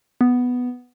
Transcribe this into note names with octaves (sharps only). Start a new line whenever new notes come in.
B3